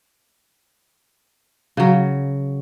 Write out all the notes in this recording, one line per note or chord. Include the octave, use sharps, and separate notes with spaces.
C#3 F#3